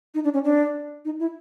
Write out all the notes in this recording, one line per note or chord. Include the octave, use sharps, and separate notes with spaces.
D#4
D4
C#4
D4
D#4
E4